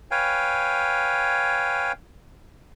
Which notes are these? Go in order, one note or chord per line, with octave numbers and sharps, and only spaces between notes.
B4 C#5 F5 G5 G#5